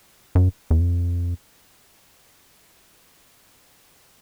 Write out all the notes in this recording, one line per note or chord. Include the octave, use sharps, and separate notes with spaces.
F#2
E2
F2